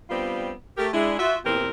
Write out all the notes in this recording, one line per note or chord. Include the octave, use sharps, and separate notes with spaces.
G3 B3 C4 D4 F4
A3 G4 A#4
G#3 D4 E4
F4 F#4 E5
E2 A#2 E3 C4 G4 A#4